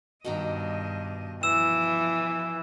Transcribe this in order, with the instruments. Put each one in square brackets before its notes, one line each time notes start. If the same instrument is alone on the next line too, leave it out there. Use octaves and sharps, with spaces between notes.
[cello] G2 D#5 [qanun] B2 D#3 A#5
[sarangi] E3 [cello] F3 [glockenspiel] E6 E7